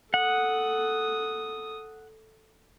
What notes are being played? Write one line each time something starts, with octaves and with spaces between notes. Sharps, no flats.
A4 F#5 D#6